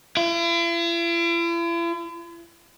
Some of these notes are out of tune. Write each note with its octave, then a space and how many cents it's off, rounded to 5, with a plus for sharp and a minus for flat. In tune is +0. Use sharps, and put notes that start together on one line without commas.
E4 +45